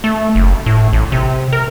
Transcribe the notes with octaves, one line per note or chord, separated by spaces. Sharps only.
A3
F#1
A2
A1
C3
A#4